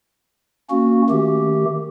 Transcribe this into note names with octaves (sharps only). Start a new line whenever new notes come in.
A#3 C#4 F#4
D#3 A3 G4